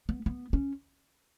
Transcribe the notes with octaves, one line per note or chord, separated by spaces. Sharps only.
B3
B3
C#4